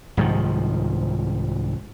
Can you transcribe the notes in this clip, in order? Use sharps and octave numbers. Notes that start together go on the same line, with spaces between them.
C2 G#2 D#3 F3